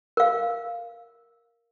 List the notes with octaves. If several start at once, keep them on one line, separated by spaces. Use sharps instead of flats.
A#4 F5